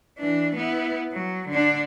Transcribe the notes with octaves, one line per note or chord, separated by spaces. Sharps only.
E3 D4
B3 E4
F#3
D3 D4